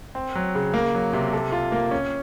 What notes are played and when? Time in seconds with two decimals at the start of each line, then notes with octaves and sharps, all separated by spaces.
0.15 C4
0.35 F#3
0.55 C#3
0.74 A#3
0.94 F#3
1.13 C3
1.33 A4
1.52 F4
1.72 A#3
1.91 C#4